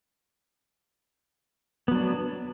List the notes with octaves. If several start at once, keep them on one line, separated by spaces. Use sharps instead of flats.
F#3 B3 D4